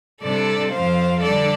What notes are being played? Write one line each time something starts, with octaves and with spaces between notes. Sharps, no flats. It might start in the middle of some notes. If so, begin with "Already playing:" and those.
C3 G3 D4 A4 D5
F2 F3 C4 C5 F5
D3 G3 D4 A4 D5